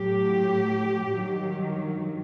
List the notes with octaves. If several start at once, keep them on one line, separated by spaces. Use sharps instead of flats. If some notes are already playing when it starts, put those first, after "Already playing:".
Already playing: A2 F#3 G4
G2 D#3 F#3